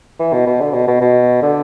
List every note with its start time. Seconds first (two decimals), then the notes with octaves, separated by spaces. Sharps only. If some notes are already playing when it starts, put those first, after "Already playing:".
0.19 E3
0.33 B2
0.47 B2
0.61 D3
0.74 B2
0.87 B2
1.01 B2
1.42 D3